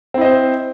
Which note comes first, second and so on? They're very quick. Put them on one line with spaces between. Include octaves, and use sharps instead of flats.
C4 E4 D#5 C5